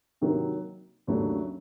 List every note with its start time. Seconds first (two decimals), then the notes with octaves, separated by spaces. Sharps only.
0.21 C3 D#3 F#3 A#3
1.07 D#2 C#3 F#3 A3 D4